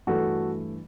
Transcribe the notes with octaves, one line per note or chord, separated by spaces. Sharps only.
G2 E3 A3 F#4 A4